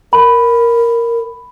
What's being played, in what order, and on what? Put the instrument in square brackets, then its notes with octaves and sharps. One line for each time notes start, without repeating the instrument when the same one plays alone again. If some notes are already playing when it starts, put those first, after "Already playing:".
[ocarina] A#4 [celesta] B5